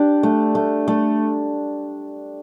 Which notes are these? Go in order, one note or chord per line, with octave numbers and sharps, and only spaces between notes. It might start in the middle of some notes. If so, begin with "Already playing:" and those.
Already playing: D4 G4
A3
A3
A3